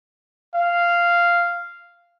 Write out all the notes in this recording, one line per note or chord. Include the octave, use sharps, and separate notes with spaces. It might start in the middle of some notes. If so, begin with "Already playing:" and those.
F5